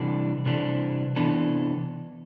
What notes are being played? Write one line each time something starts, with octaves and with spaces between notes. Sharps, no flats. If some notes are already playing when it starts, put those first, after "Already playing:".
Already playing: C3 E3 G3 D4 A4
C3 E3 G3 D4 A4
C3 E3 B3 D4 A4